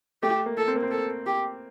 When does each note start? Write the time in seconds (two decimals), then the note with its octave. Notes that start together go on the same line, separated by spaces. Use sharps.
0.22 A3 G4
0.46 A#3
0.57 A4
0.68 C4
0.76 A#3
0.82 C4
0.91 A4
1.26 G4